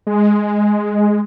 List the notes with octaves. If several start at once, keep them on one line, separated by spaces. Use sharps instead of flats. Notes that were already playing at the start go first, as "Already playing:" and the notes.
G#3